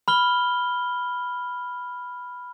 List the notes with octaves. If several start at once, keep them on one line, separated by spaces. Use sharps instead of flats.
B5 F6 G7